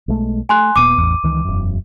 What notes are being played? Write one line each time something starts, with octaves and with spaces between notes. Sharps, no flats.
B1 G#3 A3
A3 G#5 C6 F#6
D#1 A#2 B3 D6 D#7
A1 E2
C#2 D#3 E3
E1 F#2